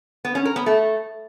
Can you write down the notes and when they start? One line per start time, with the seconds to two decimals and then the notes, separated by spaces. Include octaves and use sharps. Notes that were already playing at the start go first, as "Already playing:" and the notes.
0.25 B3
0.35 C#4
0.45 A#4
0.56 B3
0.66 A3